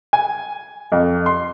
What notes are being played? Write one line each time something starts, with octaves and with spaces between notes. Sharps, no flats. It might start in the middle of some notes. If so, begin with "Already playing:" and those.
G#5
F2
C6